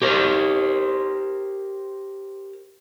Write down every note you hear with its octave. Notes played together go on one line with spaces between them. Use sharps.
G4 A#4 C5